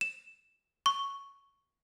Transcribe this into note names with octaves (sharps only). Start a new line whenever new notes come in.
E7
C#6